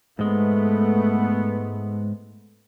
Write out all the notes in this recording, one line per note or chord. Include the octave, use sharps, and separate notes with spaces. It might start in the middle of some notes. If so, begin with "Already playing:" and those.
G#2 G#3 A3 B3